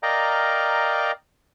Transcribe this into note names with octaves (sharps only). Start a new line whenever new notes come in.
A#4 D5 D#5 F5 G5 A#5